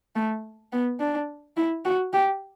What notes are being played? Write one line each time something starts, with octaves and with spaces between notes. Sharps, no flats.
A3
B3
D4
E4
F#4
G4